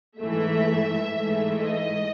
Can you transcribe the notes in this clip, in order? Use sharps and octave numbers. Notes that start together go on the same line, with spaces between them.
G#2 E3 A3 E5
G#2 E3 A3
D#5